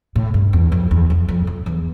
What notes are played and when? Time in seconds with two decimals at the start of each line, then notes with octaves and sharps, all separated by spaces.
0.16 A2
0.34 G2
0.53 E2
0.72 F2
0.91 E2
1.10 F2
1.28 F2
1.47 F2
1.66 E2